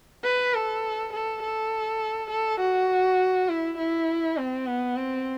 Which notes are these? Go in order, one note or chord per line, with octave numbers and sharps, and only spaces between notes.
B4
A4
A4
A4
A4
F#4
E4
E4
C4
B3
C4